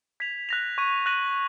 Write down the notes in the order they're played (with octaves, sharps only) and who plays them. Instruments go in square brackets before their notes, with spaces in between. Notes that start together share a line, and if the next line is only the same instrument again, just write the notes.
[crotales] G#6 B6 F7
F#6 A#6 F7
C#6 G#6 D#7
F#6 A#6 D#7 F#7